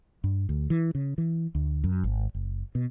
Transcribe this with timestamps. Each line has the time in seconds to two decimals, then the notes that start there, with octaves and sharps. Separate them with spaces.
0.24 G2
0.49 D2
0.70 E3
0.95 C#3
1.18 E3
1.55 D2
1.84 F#2
2.04 G#1
2.35 F#1
2.75 B2